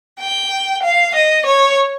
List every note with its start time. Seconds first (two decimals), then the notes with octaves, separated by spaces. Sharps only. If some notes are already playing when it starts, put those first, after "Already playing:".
0.20 G5
0.83 F5
1.14 D#5
1.46 C#5